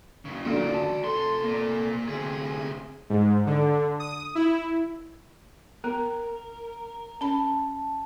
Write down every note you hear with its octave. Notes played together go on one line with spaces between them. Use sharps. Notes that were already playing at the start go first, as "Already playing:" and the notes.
F#2 C#3
A#2 D3 F#4 D5
A5
C3 A4 C6
A#3 D5
D2 C3 G#4
G#2
D3
D#6
E4
B3 A#4
C#4 A5 B5